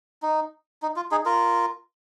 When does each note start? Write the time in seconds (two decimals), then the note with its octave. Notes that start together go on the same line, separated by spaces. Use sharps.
0.22 D#4
0.82 D#4
0.96 F4
1.11 D#4 G#4
1.26 F4 A#4